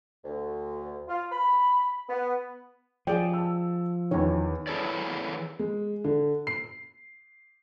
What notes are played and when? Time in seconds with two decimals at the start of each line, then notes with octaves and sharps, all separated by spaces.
0.24 D2
1.08 F4
1.32 B5
2.09 B3
3.07 F3 G#4 D5 G5
3.33 A5 E6
4.11 E2 D#3 C#5
4.67 E3 E4 G#4 A4 C#5 D5
5.59 G#3
6.04 D3
6.47 C7